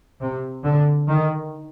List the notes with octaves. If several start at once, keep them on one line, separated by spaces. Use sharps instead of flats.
C3
D3
D#3